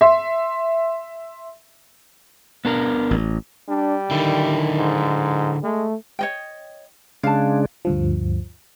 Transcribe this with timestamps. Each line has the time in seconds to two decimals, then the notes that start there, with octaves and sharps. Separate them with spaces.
0.01 E5 C6
2.65 B3 D4 A#4
3.11 A1
3.69 G3 D4
4.11 D3 D#3 E4
4.78 G#2
5.63 G#3 A3
6.19 C#5 D#5 G5
7.24 C#3 G#3 D4 F5 A5
7.85 D2 G2 F3